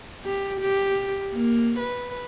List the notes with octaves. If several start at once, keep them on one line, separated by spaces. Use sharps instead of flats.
G4
G4
A#3
B4